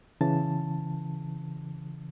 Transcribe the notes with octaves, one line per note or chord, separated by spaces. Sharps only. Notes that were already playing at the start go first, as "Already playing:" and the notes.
C#3 E3 A5